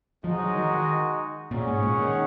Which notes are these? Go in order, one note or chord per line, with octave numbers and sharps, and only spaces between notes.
F3 G#3 D#4 F#4
F#3
D#3
D#3
A#2 C#4 G#4 C#5 F#5
G#2
A#2
D#3